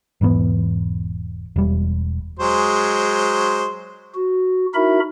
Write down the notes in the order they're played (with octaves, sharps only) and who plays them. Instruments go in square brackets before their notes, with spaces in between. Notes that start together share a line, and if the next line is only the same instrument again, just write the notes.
[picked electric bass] E1 G#2 E3 B3
E1 G3
[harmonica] F#3 G#3 C5
[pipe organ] F#4
D#4 E4 F#4 A#4 E5 B5